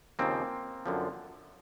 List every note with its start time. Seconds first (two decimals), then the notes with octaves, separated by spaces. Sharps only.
0.19 D#2 C#3 F3 A#3 C4
0.86 F#2 D3 F3